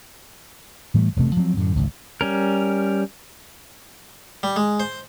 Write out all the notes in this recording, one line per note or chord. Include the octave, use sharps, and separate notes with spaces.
A2 E3 G3 A3
E1 G2 C3 A3
F3 F#3 B3 C4
F#2 A2 D3
G#1 C#2
G3 C#4 A#4
G3
G#3
C5